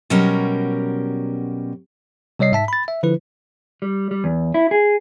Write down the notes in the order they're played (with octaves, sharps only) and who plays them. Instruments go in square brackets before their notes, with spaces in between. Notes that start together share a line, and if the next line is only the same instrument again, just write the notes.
[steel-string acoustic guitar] B2 F#3 G3 C#4 A#4 A#5
[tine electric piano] C3 G3 C#5 D#5 C7
G#2 E5 A5 B6
B5 A6
E5
D3 F3 E4 B4
[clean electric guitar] G3
G3
E2
E4
G#4